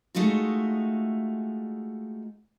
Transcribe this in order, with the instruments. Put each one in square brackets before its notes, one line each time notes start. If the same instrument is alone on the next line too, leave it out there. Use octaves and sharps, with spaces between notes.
[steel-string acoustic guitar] G#3 A3 D#4 F4 F#4